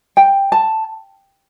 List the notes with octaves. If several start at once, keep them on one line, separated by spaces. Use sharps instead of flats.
G5
A5